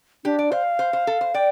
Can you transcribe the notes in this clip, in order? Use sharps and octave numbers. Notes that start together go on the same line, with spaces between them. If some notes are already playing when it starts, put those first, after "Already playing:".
D4 G4
D5
C5 F5
C5
C5
A4
C5
D5 G5